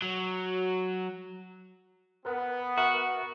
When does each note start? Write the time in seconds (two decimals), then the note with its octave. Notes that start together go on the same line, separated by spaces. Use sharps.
0.02 F#3
2.25 B3 A#4 B4
2.78 F#4 A#4 E5